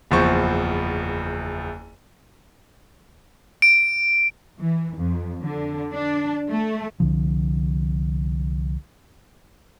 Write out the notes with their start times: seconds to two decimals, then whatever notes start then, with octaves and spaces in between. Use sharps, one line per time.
0.11 F#1 E2 F3 C5 C#6
3.62 D7
4.60 E3
4.97 F2
5.43 D3
5.94 D4
6.50 A3
7.00 C2 D3 F3